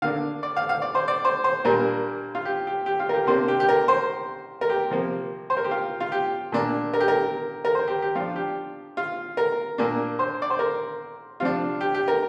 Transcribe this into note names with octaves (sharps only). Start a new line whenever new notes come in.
D3 A#3 D4 F5
D5
F5
F5
D5
C5
D5
C5
C5
A#2 G3 A#3 D4 A#4
F4
G4
G4
G4
F4
A#4
G4
C3 A#3 D4 C5
G4
G4
A#4
C5
A#4
G4
C3 F3 A#3
C5
A#4
G4
F4
F4
G4
A#2 A#3 D4
A#4
G4
A#4
A#4
C5
G4
G4
F3 D4 F4
G4
F4
A#4
A#2 A#3 D4
C5
D5
C5
A#4
C3 F3 D4 F4
G4
G4
A#4